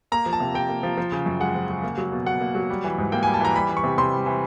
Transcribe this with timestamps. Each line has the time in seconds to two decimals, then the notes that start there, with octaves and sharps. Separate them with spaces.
0.12 A#3 A#5
0.26 F3
0.33 A5
0.40 C3
0.55 C3 G5
0.69 A#3
0.83 F3
0.98 F3
1.12 C#3
1.26 F#2
1.40 G#3 F#5
1.55 F3
1.70 C#3
1.83 A#3
1.98 F#3
2.12 B2
2.26 B2 F#5
2.41 A#3
2.55 F#3
2.70 G3
2.84 E3
2.98 G#2
3.12 A#3 G5
3.23 G#5
3.26 G3
3.34 A5
3.41 E3 A#5
3.56 G3 B5
3.69 E3
3.77 C#6
3.84 C3
3.98 C3 C6
4.12 G3
4.26 E3